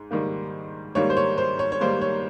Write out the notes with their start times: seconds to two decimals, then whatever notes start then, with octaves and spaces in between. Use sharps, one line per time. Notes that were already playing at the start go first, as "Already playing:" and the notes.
Already playing: G#2
0.11 G#2 D#3 G3 A#3
0.95 G#2 D#3 G3 A#3 C#5
1.10 C5
1.17 C#5
1.38 C5
1.59 C#5
1.72 C#5
1.81 G#2 D#3 G3 A#3 C5
2.02 C#5